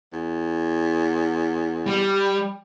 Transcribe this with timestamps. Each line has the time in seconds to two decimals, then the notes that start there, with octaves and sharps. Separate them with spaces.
0.13 E2
1.87 G3